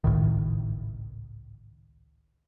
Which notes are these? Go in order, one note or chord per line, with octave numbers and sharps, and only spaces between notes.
G#1 C#2 A2 D#3